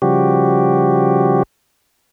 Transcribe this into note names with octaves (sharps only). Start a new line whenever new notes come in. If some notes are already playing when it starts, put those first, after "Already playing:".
C#3 F3 G3 F#4 G4